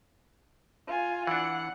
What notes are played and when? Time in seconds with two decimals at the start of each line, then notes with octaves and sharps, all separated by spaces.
0.87 F4 G#5
1.27 E3 D4 F#5